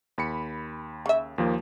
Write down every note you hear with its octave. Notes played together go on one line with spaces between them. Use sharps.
D#2 B5 C#7
C#3 E5
D#2 F3 A#3